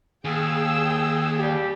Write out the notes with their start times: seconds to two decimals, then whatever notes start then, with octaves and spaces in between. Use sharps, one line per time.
0.25 D#2 G#4 G5 E6
1.39 G3 G4